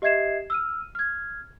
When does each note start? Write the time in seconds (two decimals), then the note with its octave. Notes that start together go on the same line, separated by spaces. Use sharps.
0.02 G4 D#5 E5 G#6 C7 E7
0.50 E6 F6 D#7
0.95 F6 G#6